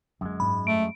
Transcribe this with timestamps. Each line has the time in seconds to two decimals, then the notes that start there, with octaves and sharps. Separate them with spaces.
0.21 F#2 D3 G#3 A#3
0.40 G#2 D4 B5
0.67 A3 D7